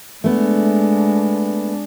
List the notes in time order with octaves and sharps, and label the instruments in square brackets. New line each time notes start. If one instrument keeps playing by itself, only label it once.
[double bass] G#3 D4 [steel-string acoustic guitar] A3 B3